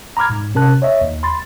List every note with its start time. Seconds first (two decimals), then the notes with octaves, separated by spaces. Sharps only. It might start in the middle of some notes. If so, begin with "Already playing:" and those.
0.17 A#5 B5 D6 F6 G#6
0.30 G#2
0.55 C3 C#4 A#4 A5 F#6
0.82 C#5 D#5 E5
1.01 D#2
1.23 B5 C6 A6